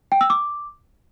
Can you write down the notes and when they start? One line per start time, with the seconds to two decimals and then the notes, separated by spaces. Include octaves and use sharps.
0.12 G5
0.21 E6
0.30 D6